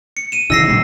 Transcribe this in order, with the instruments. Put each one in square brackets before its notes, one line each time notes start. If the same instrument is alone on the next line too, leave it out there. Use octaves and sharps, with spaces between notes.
[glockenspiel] C#7
D#7 E7
[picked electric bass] C#3 E3 [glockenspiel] E6 A#6 C7
[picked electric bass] F#2 A#2 D#3